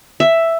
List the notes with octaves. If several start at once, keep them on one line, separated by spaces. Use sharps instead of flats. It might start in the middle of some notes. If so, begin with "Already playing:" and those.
E5